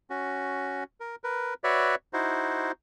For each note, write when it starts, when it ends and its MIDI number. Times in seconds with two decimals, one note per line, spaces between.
0.10 0.84 61
0.10 0.84 66
1.00 1.16 70
1.24 1.54 70
1.24 1.54 71
1.64 1.95 66
1.64 1.95 71
1.64 1.95 73
1.64 1.95 74
1.64 1.95 76
2.13 2.72 63
2.13 2.72 64
2.13 2.72 66
2.13 2.72 72